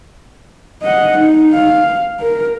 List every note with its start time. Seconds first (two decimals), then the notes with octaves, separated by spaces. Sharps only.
0.83 D#5 F#5
1.18 D#4
1.54 F5
2.20 A#4